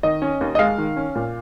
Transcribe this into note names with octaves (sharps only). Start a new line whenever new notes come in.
D#3 D#5
C#4
D#2
D#5
G#3 F5
D#3
C#4
A#2